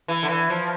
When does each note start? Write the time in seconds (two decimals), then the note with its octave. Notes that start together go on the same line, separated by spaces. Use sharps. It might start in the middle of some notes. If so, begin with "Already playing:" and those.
0.08 E3
0.23 D3
0.29 E3
0.50 F3